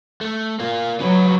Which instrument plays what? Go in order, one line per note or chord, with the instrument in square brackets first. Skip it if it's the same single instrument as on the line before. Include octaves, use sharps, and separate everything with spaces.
[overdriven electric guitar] A3
A#3 F4
[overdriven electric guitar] C#3 B4 [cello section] F#3